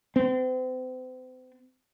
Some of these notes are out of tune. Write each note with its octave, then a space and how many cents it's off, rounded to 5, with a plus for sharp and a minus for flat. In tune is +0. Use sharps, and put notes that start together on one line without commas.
C4 -40